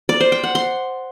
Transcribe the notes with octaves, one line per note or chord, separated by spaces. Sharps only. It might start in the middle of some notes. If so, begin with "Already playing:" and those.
D5
C5
G5
F#5
C6